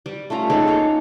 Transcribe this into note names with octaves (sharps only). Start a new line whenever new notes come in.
G3
A3 C#4 F4 A#5
G#3 D#4 A4 C#5
A#3 D#4 F5